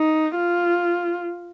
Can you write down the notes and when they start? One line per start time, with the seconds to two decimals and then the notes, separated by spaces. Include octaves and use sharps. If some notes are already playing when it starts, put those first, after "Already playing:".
Already playing: D#4
0.36 F4